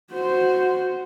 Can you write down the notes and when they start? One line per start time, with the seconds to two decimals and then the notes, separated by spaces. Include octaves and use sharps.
0.11 F#4 C5